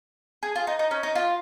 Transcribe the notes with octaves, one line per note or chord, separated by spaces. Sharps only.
G#4
F4
D#4
D#4
C#4
D#4
F4